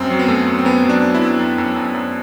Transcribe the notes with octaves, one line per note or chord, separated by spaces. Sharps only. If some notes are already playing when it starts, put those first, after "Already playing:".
Already playing: F#2 C4
F#3
B3
F#2 A3
F#2
C4
F#2 B3
F#3
D4
F#2
E4
F#2
F#2
F#2
F#2
F#2